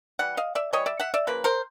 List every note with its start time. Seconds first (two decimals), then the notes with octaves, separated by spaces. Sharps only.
0.19 E3 G3 F#5
0.37 D#5 F5
0.55 D5 E5
0.73 E3 G3 C#5 D#5
0.86 D5 E5
1.00 E5 F#5
1.14 D5 E5
1.27 C#3 F3 A#3 B4
1.44 A#4 C5